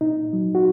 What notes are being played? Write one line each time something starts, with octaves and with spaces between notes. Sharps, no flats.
A#2 D#4
F#3
F#4